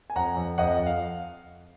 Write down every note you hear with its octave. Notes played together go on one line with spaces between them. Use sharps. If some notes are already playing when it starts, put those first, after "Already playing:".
G#5
F2 F#5 A#5
F2
F2 D#5 F#5
F2
F5